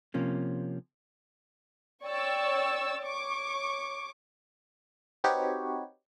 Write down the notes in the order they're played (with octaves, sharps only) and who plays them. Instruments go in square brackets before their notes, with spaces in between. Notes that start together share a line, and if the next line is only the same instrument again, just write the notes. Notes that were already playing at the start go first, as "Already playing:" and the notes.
[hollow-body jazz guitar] C3 F3 A#3 C#4
[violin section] C#5 D5 G5 C#6 E6 A6
C#5 C#6 D6
[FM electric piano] C4 D#4 F#4 G4 B4 C#5